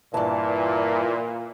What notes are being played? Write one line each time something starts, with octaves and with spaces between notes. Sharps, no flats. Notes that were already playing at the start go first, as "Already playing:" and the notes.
G2 A#2 E3 A5